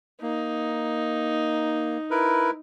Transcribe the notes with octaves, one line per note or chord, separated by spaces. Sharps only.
A#3 D#4
E4 A#4 B4